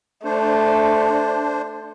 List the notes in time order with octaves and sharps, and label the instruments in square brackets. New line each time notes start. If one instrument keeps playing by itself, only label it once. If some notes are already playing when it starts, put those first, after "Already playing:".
[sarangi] A3 [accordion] D4 C5